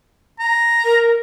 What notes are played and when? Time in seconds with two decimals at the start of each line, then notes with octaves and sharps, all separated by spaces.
0.39 A#5
0.83 A#4